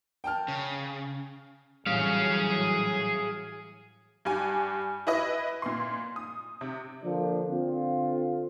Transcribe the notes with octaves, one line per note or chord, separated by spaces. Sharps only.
G5 A5 F6
C#3
A2 E3 F#3 G3 G#4 F5
G2 G4 G#5
E4 B4 D#5 E5
A#2 C6
D#6
C3
D3 F3 A#3 D4 C5
D3 C4 F4